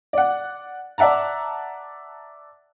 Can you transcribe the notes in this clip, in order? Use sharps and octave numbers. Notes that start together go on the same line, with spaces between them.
D5 F#5
D5 E5 F#5 A5 A#5